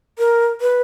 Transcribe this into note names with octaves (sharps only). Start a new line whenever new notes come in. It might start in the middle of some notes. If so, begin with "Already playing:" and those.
A#4
B4